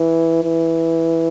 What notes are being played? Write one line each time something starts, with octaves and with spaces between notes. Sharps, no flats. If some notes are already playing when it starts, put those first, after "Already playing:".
Already playing: E3
E3